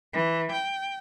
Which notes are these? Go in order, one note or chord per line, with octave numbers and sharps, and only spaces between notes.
E3
G5